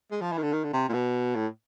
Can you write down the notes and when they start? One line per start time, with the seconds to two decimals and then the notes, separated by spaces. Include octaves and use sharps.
0.11 G#3
0.21 F3
0.32 E3
0.38 D#3
0.43 D3
0.53 D#3
0.64 D3
0.73 C3
0.89 A#2
0.93 B2
1.35 A2